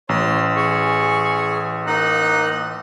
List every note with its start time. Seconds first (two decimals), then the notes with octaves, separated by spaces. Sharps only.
0.09 A1 C#5 C6
0.56 G#4 G#5 C#6
1.87 A#3 D#4 F#5 F#6